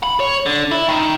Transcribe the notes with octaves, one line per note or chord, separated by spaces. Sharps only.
B5
C#5
D3
E4
D#3